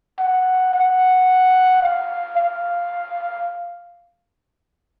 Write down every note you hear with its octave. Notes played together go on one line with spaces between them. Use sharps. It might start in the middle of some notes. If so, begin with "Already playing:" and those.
F#5
F#5
F5
F5